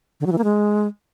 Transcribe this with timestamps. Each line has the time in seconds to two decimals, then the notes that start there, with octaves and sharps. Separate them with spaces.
0.20 D3
0.26 F#3
0.32 E3
0.38 A#3
0.44 G#3